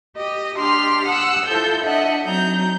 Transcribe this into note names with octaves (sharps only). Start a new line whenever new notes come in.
G4 D#5
D4 G4 C6 F6
F#5 D#6 E6 F#6
F3 E4 A4 G6
D4 D#5 E5 F#5
F#3 C4 D#4 A#5 G6